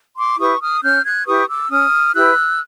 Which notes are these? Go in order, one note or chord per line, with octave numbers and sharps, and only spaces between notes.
C6 D6
E4 G4 B4 C#6 D#6
D#6 F6
C#4 F6 G6
F#6 G#6
E4 G4 B4 C#6 D#6
D6 E6
C#4 D#6 F6
E4 G4 B4 E6 F#6